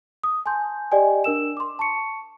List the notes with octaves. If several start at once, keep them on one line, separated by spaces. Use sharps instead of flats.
D#6
G#5 A5 C6 G6
G4 D5 D#5 G5 G#5
D4 A#4 E6 E7
C6 D6
A5 C#6 C#7